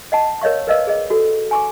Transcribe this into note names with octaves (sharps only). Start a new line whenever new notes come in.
D#5 F#5 A5
A#4 C#5 D#5 F5 C#6
A#4 B4 D5 D#5 F5 E6
G#4 D#5
F#4 A4
G#5 C#6 D6